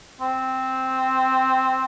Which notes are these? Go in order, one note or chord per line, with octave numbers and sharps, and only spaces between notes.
C4